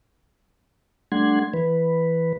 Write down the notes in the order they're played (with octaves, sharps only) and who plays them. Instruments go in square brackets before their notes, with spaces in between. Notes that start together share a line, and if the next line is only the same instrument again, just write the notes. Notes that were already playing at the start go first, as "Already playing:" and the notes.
[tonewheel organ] G3 A3 D4 F#5 C6 G#6
E3 B4